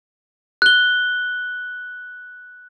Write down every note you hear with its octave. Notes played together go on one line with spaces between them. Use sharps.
F#6 G7